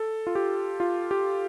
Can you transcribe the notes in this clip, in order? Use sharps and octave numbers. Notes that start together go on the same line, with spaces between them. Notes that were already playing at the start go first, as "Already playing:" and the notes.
Already playing: A4
F4
G4
F4
G4